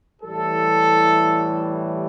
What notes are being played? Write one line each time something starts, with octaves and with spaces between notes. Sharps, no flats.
A2 E3 G3 A4